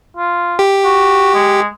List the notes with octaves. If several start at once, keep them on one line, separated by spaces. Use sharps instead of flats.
F4
G4
F#4
G#3